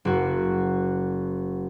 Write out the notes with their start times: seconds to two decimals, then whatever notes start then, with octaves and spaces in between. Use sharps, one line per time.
0.05 F#1 F#4